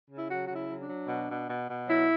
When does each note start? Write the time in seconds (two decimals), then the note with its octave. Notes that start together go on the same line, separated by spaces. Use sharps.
0.09 C#3
0.18 E4
0.29 F#3 F#4
0.47 C#3 F#4
0.55 E4
0.68 F#3
0.81 D4
0.89 F#3
1.08 B2
1.29 B2
1.49 B2
1.69 B2
1.88 F#3 E4